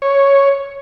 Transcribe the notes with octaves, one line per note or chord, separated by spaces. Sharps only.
C#5